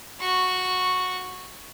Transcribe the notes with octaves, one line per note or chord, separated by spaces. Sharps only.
F#4 C#6